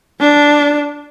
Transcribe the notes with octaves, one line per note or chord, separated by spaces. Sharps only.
D4